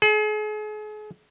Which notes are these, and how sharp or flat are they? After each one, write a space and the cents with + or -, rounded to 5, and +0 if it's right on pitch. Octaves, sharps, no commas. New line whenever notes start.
G#4 +40